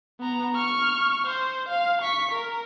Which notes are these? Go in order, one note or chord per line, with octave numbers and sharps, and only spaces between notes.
B3 A#5
C#6 F6
C5
F5
C#6 B6
A#4